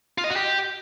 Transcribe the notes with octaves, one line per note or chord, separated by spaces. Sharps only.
F4
D#5
F#4
G4